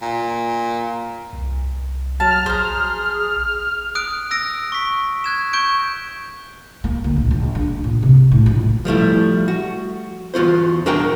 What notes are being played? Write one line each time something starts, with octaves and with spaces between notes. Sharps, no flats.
A#2
C2
F#3 A5 F6
A#1 G#4 C5 A#5
D#6 F#6 D7
E6 A#6 D7
C#6 B6
F#6 G#6 E7
C#6 G6 D7
A#3
D2
A#1
A#1
D4
A#2
C3
A2
A#1
F3 G3 A3 E4
F#4
E2 F4 F#4 C5
D4 F#4 A#4 F#5 G5